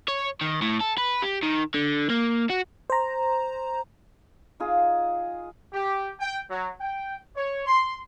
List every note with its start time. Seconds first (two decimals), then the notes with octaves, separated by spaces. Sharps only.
0.08 C#5
0.41 D#3
0.62 A2
0.81 A4
0.98 B4
1.22 G4
1.43 D#3
1.74 D3
2.10 A#3
2.50 F#4
2.90 C5 A#5
4.60 D#4 F4 G#4
5.73 G4
6.20 G5
6.50 F#3
6.80 G5
7.36 C#5
7.66 C6